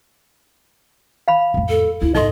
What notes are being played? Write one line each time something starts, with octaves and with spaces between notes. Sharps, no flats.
F5 B5
F2 A2
A4
D2 D3 E4
F#1 G#2 D#4 A4 D#5 C6